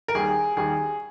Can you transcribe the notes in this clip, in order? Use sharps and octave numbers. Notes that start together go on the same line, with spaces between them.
A#4
D#2 D#3 G3 G#4
D#2 D#3 G3 G#4